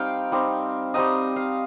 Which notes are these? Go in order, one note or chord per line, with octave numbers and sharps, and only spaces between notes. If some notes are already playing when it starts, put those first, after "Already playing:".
Already playing: G3 C4 D#4 F5 G5
G3 C4 D#4
G3 C4 D#4 D#5
F5